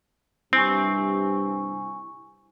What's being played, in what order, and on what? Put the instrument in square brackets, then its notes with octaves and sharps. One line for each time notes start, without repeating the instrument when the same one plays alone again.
[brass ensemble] G2 C3 [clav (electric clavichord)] C4 [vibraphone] E4 G#5 C#6